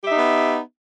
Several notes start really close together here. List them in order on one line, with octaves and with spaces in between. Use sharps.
G4 E5 D#4 B3